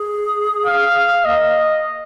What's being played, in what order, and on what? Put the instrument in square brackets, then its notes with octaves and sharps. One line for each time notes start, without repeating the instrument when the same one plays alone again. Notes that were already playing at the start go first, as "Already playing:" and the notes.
Already playing: [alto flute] G#4
[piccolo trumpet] F5
[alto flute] A#3 [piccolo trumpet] D#5